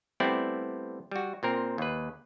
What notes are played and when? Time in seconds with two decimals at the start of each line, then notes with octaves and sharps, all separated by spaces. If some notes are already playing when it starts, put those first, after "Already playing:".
0.20 G3 A3 B3 C4 E4 D5
1.11 G3 F#4
1.43 A#2 C4 A#4
1.78 D#2 B4